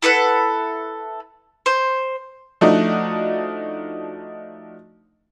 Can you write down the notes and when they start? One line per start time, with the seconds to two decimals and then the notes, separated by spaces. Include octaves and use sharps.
0.02 E4 A4 B4 F#5
1.66 C5
2.61 F3 A3 D4 D#4 F#4